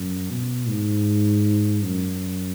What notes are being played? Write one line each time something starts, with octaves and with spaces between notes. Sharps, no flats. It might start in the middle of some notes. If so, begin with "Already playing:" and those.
Already playing: F#2
B2
G#2
F#2